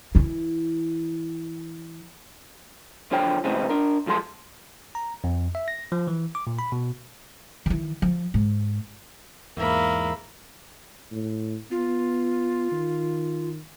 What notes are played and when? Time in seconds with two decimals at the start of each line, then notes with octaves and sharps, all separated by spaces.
0.15 E3 E4
3.11 B1 D3 F3 C#5 G5
3.44 A2 C3 E3 G#3 C4 C#4
3.69 D4 A#4
4.06 B1 F3 G#3 A4 C6
4.95 A#5
5.24 F2
5.55 E5
5.68 A#6
5.92 F3
6.07 E3
6.35 D6
6.47 A#2
6.59 B5
6.72 B2
7.66 D#3 E3
8.02 F3
8.34 G#2
9.57 E2 G#2 A#3 E5 B5
11.12 A2
11.71 B3 F4
12.71 D#3